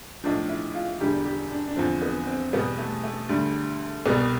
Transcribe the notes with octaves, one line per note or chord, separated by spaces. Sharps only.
B1 A2 F3 D4
E4
F4
E1 E2 D3 G3 G4
G4
D4
D4
E2 D3 F3 C4
B3
C4
E2 B2 G3 B3
A3
A3
D2 D3 G3
C2 B2 G3 B3